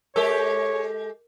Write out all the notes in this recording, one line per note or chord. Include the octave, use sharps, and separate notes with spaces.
G#3 G4 A4 A#4 C#5